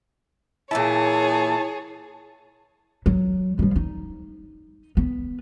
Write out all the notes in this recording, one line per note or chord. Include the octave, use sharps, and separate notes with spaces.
A#2 E3 E4 G#4 C#5 A5
F#3
F3 G3
D#4
B3